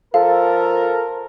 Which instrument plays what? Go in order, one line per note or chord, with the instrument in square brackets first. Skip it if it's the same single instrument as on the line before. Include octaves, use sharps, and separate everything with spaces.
[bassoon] F3 [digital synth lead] A4 [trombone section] A#4 [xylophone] F5